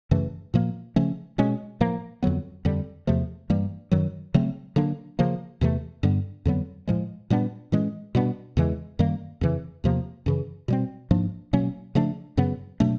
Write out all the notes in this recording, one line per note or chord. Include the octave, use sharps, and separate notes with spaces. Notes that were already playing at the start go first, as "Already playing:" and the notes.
F#2 C#3 E3 A3
A#2 F3 A#3
C#3 F3 A3 C#4
B2 G#3 C#4
A2 F3 A#3
F2 D3 F#3 B3
F2 D3 G3
E2 C3 F3 A3
G2 E3 G3 A#3
F#2 D#3 F#3
C#3 F#3 A3 C4
D3 F#3 A#3 D4
C#3 F3 A#3
E2 C3 E3 A3
G2 D3 G3 B3
F2 D3 F#3 B3
A2 F3 G#3
A#2 G3 B3 D4
A2 E3 G#3 C#4
B2 G3 B3 D4
E2 C#3 E3 G#3
F#2 D#3 G3 A#3
F2 C#3 E3
E2 C3 F3 A#3
F#2 C#3 E3
B2 G3 C4
G#2 F3 A#3 D4
B2 F#3 A#3 C#4
C#3 F3 A3 D4
F#2 C#3 F#3 B3
B2 F#3 A3 D4